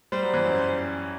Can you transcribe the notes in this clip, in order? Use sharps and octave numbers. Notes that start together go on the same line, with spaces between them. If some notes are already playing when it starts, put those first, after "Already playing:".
G3 C5
F#3
E3
F#2 F#3